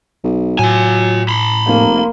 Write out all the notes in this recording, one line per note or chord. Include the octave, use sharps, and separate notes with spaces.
B1
A2 F#3 F4 G#5
B5 C6
F1 A#3